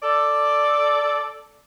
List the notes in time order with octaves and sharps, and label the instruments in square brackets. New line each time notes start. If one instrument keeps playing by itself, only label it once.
[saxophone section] A4 D5